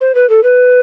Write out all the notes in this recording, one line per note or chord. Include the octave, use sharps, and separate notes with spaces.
C5
B4
A4
B4